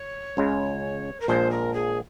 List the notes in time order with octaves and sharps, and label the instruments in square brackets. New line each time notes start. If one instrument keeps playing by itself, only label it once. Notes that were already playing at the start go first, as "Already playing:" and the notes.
Already playing: [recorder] C#5
[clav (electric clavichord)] C#2 C#3 G#3
[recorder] A#4
[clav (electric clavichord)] A#1 A#2 F3 G#3 [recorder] C5
[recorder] A#4
G#4